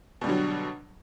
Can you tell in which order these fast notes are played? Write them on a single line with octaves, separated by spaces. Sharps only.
B2 G3 D3 F#3